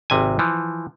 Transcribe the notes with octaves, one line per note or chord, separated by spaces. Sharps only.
G#1 C3 G#5
E3 F3